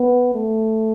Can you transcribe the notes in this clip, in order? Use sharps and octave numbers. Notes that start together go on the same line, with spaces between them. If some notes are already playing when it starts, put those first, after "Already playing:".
Already playing: B3
A3